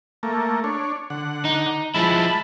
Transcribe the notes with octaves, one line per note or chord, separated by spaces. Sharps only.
A3 A#3
D4 C#5
D3 F#5
D#4
F3 G#3 E4 A5 B5